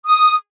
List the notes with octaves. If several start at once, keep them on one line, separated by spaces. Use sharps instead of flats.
D#6